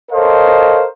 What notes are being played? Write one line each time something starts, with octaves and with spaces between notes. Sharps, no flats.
A4 A#4 C5 C#5 D#5 F5